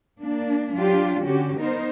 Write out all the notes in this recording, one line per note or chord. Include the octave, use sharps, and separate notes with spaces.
A#3 D4
F#3 D4 F4 G4
D3 C#4 F#4 G4
B3 D#4 A#4 C5